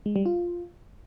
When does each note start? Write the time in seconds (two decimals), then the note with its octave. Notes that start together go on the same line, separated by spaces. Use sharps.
0.06 G#3
0.16 G3
0.26 F4